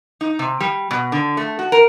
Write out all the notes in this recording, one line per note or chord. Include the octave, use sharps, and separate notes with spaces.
D#4
C3
G3
B2
D3
A3
F#4
A#4